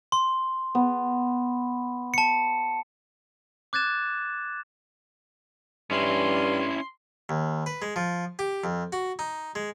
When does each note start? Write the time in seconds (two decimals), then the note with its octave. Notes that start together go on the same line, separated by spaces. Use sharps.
0.12 C6
0.75 B3
2.14 A5 C#7
3.73 D6 F#6 G#6 A6 E7
5.91 G2 C#4 E4 C6
7.29 D#2
7.66 B4
7.82 G#3
7.96 F3
8.39 G4
8.64 F2
8.93 F#4
9.19 D#4
9.55 G#3